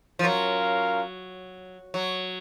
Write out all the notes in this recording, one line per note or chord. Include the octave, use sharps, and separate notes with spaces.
F3
F#3 C#4 F4 A#4 F5
F#3